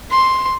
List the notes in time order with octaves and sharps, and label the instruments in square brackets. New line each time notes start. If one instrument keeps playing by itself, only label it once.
[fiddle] C6